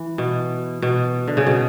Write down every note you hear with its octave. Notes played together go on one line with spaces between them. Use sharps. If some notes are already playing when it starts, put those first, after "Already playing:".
Already playing: E3
B2
B2
D3
C#3
B2